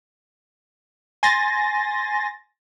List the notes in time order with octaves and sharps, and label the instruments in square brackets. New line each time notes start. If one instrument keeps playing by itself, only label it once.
[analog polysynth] G#5 C6 A6 A#6